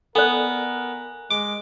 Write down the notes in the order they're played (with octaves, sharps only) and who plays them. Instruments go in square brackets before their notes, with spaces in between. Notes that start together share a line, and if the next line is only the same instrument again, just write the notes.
[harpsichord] B3 [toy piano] A4 D5 [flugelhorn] A#4 [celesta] G#5 F#6
[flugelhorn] G#3 [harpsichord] D6